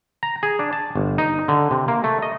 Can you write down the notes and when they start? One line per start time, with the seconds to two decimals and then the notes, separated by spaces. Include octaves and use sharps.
0.23 A#5
0.43 G#4
0.59 D4
0.73 A5
0.95 G1
1.18 D#4
1.48 D3
1.71 C3
1.88 A#3
2.04 A3
2.22 D#5